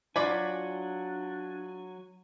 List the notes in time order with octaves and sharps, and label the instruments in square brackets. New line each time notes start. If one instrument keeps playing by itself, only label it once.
[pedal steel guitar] F#3 F#4 G#5 [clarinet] D4 [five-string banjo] F4 D5 B5